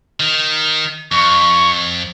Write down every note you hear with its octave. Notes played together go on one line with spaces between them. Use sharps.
D#3
F2 C#6